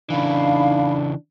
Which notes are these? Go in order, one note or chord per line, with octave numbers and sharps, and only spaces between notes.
C#3 E3 D4 D#4 F5 B5